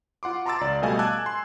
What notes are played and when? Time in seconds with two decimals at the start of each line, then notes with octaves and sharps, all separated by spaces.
0.23 F4 F#5 C6 D6
0.46 A5 A#5 C6 D6 E6 A6
0.61 C#2 D5
0.82 B2 G3 A3 D#5 F5 G#5
0.99 G#5 A5 D6 E6 F#6 G#6
1.26 C6